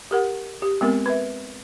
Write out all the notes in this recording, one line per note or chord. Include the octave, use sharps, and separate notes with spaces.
G4 A#4 F#5
G4
G#3 B3 C4 A#4
B4 E5